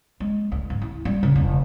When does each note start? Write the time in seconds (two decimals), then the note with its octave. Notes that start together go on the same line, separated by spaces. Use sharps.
0.20 G#3
0.52 D2
0.70 G#2
0.82 E4
1.05 G3
1.23 C#3
1.36 E1